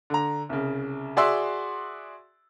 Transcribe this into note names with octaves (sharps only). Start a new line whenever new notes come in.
D3 A#5
C2 C#3
F#4 G#4 D5 E5 C6 E6